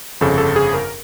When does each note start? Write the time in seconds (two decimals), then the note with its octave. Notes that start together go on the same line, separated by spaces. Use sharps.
0.21 G1 F2 C#3 A4
0.38 A4
0.56 G#4
0.73 A#4